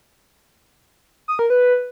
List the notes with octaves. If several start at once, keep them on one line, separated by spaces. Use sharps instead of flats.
D#6
A#4
B4